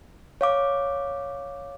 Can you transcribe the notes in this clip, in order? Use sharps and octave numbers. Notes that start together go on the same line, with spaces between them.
C#5 F5 D6